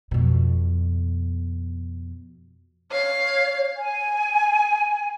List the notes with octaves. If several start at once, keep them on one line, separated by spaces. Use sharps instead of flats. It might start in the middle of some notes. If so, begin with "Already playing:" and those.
F2 B2
C#5 F5
G#5